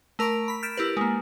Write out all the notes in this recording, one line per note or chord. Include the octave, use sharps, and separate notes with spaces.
A3 A#4 A#5 C#6 D7
B5 B6
F6 G6 A6 B6 D7 E7
E4 G4 A#4 B4
G#3 A#3